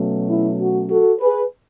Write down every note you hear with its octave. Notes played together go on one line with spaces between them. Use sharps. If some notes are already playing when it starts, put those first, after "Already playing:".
Already playing: B2 F#3 A3 C#4
E4
F#4
F#4 A4
G#4 B4